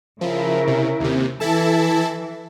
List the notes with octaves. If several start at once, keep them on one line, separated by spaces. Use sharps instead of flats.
C#3 F3 E4 A#4
C3
D#2 C3
E3 E4 A4 A5